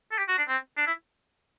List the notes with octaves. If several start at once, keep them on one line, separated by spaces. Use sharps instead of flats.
A4
G4
F#4
D4
C4
D4
E4